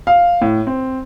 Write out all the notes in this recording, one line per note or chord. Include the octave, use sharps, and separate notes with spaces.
F5
A2
C4